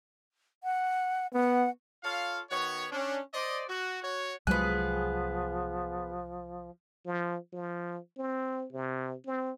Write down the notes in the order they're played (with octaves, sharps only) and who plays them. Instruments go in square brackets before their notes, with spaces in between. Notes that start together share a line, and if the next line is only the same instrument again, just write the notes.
[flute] F#5
[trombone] B3 [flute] F#5
[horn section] F4 A4 C#5 F5
D#3 B3 F#4 C#5
C#4 D4
C5 D5 D#5
F#4
F#4 C#5
[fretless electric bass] C2 F#3 G#3 [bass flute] F3 [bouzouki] B3 G#4 [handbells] F#6
[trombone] F3
F3
C4
C3
C4